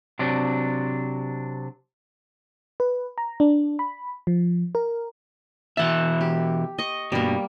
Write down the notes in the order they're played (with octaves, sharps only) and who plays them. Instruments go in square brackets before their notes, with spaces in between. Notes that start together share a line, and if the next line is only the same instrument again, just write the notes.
[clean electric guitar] C3 F#3 D4
[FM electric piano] B4
A#5
D4
B5
F3
A#4
[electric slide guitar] B2 E3 E5 [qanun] F#5 A5
[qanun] G4
D#5 C#6
[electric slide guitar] G2 B2 [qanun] G3 A#3